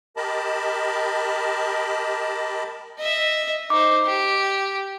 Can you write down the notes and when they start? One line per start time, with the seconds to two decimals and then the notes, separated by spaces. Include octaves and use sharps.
0.17 G4 A#4 D#5 A5 B5
2.99 D#5 E5
3.70 D#4 C5 D6
4.06 G4